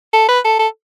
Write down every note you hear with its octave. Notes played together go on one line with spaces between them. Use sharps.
A4
B4
A4
A4